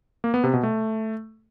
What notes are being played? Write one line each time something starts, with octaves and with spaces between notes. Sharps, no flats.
A#3
B3
C3
B2
A3